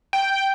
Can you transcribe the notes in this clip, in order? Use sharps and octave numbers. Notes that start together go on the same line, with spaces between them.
G5